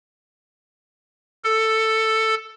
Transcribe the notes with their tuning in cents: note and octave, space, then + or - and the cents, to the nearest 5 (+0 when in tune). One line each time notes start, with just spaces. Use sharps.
A4 +10